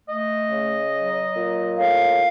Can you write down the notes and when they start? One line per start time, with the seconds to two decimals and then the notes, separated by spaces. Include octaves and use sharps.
0.07 A3 D#5
0.51 C#3
0.93 F#3
1.36 A#2
1.78 A2 F5